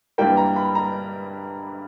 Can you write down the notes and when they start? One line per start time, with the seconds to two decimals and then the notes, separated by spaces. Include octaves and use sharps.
0.18 G2 E3 G3 A#3 G5
0.37 A#5
0.56 B5
0.75 A#5